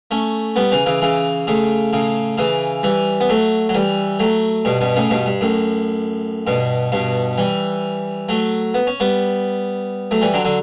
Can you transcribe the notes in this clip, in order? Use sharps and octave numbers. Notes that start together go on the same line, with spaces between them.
A3 C#4
G3 B3
C#3 E3
C#3 E3
C#3 E3
A2 C#3
A2 C#3
C#3 E3
E3 G3
B3
F#3 A3
F#3
E3 G3
F#3 A3
G2 B2
G2 B2
A2 C#3
G2 B2
G2
F#2 A2
G2 B2
G2 B2
E3 G3
F#3 A3
B3
C#4
G3 B3
F#3 A3
E3 G3
D3 F#3
D3 F#3